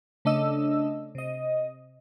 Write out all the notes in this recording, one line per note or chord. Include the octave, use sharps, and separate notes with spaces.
C#3 A3 D4 D#5 E6
C3 D#5